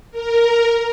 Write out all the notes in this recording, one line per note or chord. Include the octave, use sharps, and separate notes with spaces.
A#4